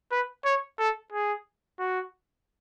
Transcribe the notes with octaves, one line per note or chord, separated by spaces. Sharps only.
B4
C#5
A4
G#4
F#4